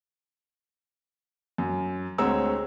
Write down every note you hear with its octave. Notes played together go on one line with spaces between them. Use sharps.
F#2
D2 G#3 C4 C#5 A#5 E6